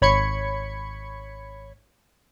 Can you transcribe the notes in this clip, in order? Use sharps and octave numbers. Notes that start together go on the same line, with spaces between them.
G#1 C#5 B5 G#6 C#7